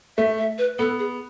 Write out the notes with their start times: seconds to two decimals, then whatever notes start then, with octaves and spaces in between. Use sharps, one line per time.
0.17 A3 E5
0.38 E5
0.58 B4
0.79 B3 A4
0.99 G#4